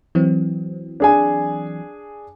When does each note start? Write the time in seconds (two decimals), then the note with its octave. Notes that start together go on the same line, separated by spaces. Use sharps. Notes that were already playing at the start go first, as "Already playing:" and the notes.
0.15 E3 F#3 C4
1.00 D4 G#4 G#5